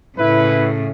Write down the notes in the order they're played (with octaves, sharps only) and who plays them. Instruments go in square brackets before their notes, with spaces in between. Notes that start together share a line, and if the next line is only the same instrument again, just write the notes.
[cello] A2 C#3 [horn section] E4 B4